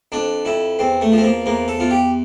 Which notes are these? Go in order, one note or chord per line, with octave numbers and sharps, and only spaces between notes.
F2 D4
F2 E4
E2 C4
A3
F3
C4
A#3
E2 A#3
A4
E2 F4
G4